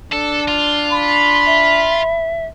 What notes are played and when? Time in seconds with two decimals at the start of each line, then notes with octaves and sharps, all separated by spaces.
0.12 D4 A4
0.48 F4
0.93 B5
1.46 E5